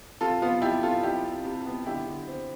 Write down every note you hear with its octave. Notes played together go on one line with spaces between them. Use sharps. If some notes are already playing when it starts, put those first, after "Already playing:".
C3 F4 A4
B3 F4
C3 E4 G4
C3 F4 A4
C3 E4 G4
C3
C3
B3
D3 E4 G4
D3
C4